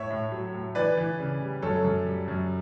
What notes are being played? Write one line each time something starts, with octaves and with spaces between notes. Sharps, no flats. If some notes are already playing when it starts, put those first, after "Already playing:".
Already playing: A2 C#5 E5
A2
F#3
A2
E3 B4 D5
E3
C#3
G3
F#2 A4 C#5
F#2
G3
F#2